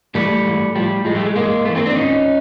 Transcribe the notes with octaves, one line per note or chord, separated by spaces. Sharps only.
G#2 E3 G3 A3
G#2 E3
A2 F3 G3
A2 F3 G#3
G3 A3
G#3
G#2 E3 G#3 A#3
G#2 E3 A3 B3
A#3 C4
C4 D4
G#2 D#3 C#4 D#4